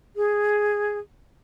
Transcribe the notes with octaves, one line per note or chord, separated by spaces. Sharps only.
G#4